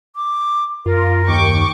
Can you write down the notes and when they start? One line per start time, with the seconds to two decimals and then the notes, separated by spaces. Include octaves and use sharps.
0.16 D6
0.86 F#2 F4 A#4
1.28 D#2 G5 C#6 D6